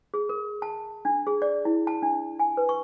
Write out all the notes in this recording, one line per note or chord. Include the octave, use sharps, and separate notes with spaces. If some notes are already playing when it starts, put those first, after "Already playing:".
G#4
A#4
A5
D4
G#4
D5
E4
A5
D4
G#5
B4
C#6